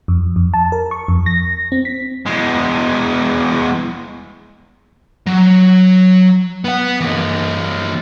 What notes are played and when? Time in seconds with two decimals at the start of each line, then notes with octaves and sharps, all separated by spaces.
0.08 F2
0.36 F2
0.54 A5
0.72 A#4
0.91 C#6
1.08 F2
1.26 A#6
1.72 C4
1.85 B6
2.26 E2 G#3
5.26 F#3
6.65 B3 F#5
7.01 E3 A#3